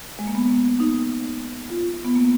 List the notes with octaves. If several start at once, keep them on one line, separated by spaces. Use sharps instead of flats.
G#3
A#3
B3
D#4
F4
B3
A#3